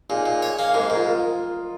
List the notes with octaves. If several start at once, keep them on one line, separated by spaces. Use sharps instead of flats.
A#2 D#4 G#4
A#2
C#5
A#3
F5
G#2 A#4 D#5
A#4 D#5
G#2
F4 A#4
F4 A#4